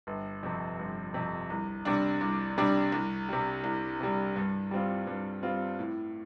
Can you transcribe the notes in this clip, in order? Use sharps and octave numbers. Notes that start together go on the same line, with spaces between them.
G1
F2 C3
G1
F2 C3
C2
C3 G3 D4
C2
C3 G3 D4
C2
C3 G3
C2
C3 G3
G2
G3 C4 F4
G2
G3 C4 F4
A2